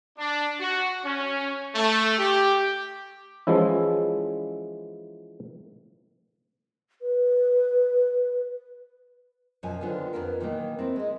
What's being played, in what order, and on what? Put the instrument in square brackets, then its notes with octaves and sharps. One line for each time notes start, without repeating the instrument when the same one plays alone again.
[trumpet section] D4
F#4
C#4
A3
G4
[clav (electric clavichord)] E3 F3 G#3 C#4 E4
[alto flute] B4
[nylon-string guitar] F#2 B2 F3 G#5
D3 D#3 B3 F4 C5
F2 B2 B3 F4 A#4
A#2 D#3 E3 F#3 A3 A#3
C4 E4 A#4
G#3 D#5